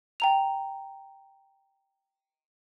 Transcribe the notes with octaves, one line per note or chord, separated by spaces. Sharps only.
G5 A#5 F7